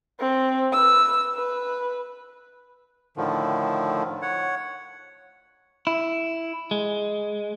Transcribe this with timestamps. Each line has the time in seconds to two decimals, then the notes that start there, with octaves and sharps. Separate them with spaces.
0.20 C4
0.72 B4 E6
1.36 B4
3.17 A2 D3 D#3 F3
4.22 C#5 F#5
5.87 E4
6.71 G#3